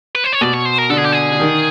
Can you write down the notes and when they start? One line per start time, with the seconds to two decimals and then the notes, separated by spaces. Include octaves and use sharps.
0.15 B4
0.24 C5
0.33 C#5
0.41 B2 D5
0.54 C#5
0.66 C5
0.78 A#4
0.90 D3 A4
0.98 G#4
1.05 G4
1.13 G#4
1.32 D3
1.40 D#3